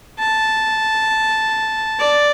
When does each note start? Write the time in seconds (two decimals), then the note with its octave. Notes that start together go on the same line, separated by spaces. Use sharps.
0.19 A5
1.99 D5